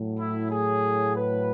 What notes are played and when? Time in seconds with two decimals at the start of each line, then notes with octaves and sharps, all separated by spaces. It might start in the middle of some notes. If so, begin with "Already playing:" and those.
Already playing: A2 F#3
0.19 E4
0.51 G#4
1.16 B4